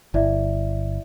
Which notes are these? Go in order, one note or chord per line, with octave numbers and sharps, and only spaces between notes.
G1 E4 D5 E5